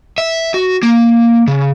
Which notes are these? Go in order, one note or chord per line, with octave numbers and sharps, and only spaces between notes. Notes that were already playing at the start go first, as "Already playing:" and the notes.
E5
F#4
A#3
C#3